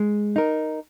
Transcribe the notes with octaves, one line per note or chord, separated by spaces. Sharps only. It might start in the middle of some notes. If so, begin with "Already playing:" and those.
Already playing: G#3
D#4 A#4